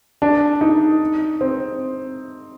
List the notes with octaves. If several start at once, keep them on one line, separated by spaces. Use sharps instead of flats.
D4
D#4
C4